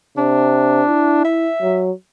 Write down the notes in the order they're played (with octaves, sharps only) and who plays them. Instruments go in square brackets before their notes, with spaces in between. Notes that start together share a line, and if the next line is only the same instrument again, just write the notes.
[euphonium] C3 [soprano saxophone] D4
[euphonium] E4
[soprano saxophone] E5
[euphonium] F#3